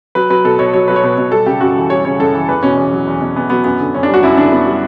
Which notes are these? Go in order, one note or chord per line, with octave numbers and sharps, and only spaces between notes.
F#3 B4
F#3 B4
B2 A4
B2 C#5
F#3 C#5
F#3 B4
C#5
B2 B4
B2
G3 A4
C#3 G4
F#2 F#4
E3
G3 C#5
C#3 C#5
F#2 A4
E3
E2 B4
B2 C#4
E2
F#3
E2
B2
E2 B3
F#3 B3
F#2 B3
D3
F#2 C#4
D4
G3
F#4
F#2 E4
D3 D4
F#2 B3
G3